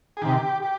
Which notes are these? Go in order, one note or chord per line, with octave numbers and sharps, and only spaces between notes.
G#4
C3 D#3 G4
G4